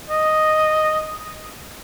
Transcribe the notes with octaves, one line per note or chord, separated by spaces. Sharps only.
D#5